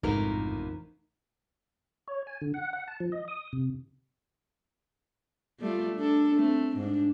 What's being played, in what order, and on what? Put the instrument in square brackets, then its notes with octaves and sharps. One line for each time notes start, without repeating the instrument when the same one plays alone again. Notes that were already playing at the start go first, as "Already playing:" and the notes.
[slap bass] A1 F2 C3 [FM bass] G#2 [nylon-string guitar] D#4 A#4
[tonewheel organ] C#5
G#5
D3
F#5
F#5
A5
F3
D#5
D#6
C3
[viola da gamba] G3 A3 F4
D4 A4
A3 C4
G#2 D4